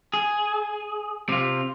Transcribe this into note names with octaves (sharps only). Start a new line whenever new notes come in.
G#4
C3 F4